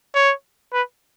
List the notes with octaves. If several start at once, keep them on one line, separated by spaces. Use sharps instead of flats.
C#5
B4